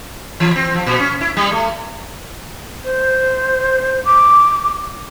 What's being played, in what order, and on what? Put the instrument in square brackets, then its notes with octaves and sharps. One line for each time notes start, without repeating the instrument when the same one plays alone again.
[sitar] E3
C4
F3
A#2
C#4
E4
G3
A3
[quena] C5
D6